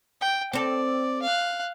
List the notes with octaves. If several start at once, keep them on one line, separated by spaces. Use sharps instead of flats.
G5
C4 A4 D5
F5 F#6